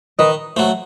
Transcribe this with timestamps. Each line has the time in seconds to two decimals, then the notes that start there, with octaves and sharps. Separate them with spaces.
0.19 D#3 B4 D#5
0.56 F#3 A3 C5